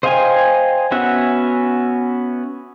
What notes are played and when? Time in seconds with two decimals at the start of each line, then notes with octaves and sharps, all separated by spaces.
0.03 C5 D#5 F5 G5 G#5
0.92 B3 C#4 F#4 E5 F#6